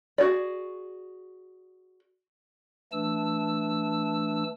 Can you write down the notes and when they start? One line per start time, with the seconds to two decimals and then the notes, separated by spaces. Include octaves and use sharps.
0.18 F#4 G#4 D5
2.92 E3 A3 D4 A5 E6